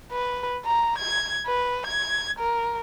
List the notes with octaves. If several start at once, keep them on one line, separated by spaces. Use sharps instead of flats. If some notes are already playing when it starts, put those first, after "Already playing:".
B4
A#5
G#6
B4
G#6
A#4